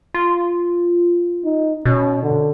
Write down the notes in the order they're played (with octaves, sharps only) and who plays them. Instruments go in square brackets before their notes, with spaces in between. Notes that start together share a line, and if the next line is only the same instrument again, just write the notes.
[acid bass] F4
[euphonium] D#4
[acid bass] B2 [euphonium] C#4
[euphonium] D3